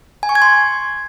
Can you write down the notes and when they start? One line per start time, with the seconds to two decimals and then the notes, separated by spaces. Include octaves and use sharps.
0.23 G#5
0.29 C#6
0.35 G#6
0.42 C6